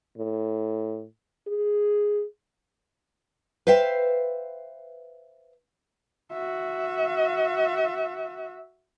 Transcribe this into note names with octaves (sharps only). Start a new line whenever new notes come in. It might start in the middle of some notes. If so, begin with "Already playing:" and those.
A2
G#4
B4 C5 E5 F5 G5
F#4 E5